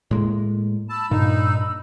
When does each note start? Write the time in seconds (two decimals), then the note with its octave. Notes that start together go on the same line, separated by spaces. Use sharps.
0.11 A2 G#3 A#3
0.89 A5 B5 E6
1.11 G2 A#2 D#4